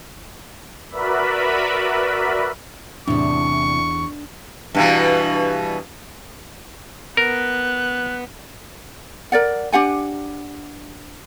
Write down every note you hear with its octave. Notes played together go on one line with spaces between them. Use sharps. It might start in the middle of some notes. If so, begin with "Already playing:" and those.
F#4 A#4 B4 D5 E5 B5
E2 A2 C3 D4 C#6
G2 B2 E3
B3 A#4 F#6
A#4 D5 F#5
D4 G4 F#5 G#5